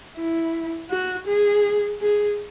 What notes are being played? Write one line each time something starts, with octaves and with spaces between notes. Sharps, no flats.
E4
F#4
G#4
G#4